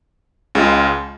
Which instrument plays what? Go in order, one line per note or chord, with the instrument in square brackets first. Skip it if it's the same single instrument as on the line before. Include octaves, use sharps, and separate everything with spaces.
[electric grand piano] C#2 C#3 G#3 C#4 F4